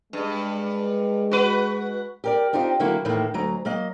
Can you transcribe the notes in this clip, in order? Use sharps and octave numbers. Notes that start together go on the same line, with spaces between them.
G2 G#3
F#4 B4
G4 A#4 D5
C4 D4 D#4 F4 G4
D3 F#3 A#3 E4 F#4
E2 A2 D#3 E3 A3 A#3
D2 F#3 A#5
F#3 A#3 D#5